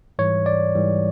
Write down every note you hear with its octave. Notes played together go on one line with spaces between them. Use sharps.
G#2 E3 G3 C#5
D5
G#2 E3 G3